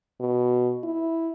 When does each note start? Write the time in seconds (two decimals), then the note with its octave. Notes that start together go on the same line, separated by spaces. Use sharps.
0.20 B2
0.84 E4